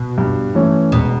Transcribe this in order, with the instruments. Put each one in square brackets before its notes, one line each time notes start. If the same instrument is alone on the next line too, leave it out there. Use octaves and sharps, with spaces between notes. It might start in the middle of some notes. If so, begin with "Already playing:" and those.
Already playing: [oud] B2
[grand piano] G2
E3 A3 C#4
[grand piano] E1 [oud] B2